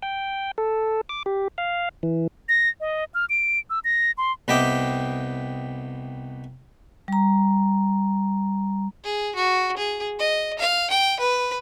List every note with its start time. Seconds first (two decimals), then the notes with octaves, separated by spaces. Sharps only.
0.02 G5
0.58 A4
1.09 D6
1.26 G4
1.58 F5
2.03 E3
2.49 A#6
2.81 D#5
3.14 F6
3.30 D7
3.70 E6
3.84 A#6
4.18 C6
4.48 C2 B3 D#5 E5 G5 D6
7.08 G3 A#5
9.04 G#4
9.35 F#4
9.77 G#4
10.19 D#5
10.59 F5
10.90 G5
11.20 B4